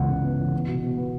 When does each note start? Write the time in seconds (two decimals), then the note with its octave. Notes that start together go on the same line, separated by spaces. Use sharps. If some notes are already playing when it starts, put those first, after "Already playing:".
Already playing: C#2 E3 B3 F#5
0.09 C#3
0.23 B3
0.38 E3
0.53 B3
0.68 B2
0.82 B2
0.97 B3